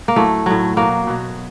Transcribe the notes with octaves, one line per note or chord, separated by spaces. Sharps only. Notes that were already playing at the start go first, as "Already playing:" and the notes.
A#3
A2 F#3 A3
A2 F#3
B2 F#3 A#3
B2 F#3